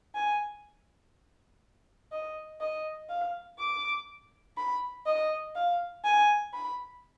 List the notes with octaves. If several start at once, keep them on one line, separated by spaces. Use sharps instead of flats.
G#5
D#5
D#5
F5
D6
B5
D#5
F5
G#5
B5